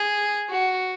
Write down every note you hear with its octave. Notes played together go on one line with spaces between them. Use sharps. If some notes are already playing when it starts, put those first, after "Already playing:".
Already playing: G#4
F#4